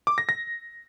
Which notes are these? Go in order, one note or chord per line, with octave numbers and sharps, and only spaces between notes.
D6
A#6
A#6